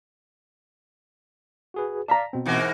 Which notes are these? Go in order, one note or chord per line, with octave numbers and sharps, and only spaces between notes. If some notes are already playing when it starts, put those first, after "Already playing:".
F#4 G#4 B4
D5 F5 A5 A#5 B6
B2 C4
G#2 E3 A#3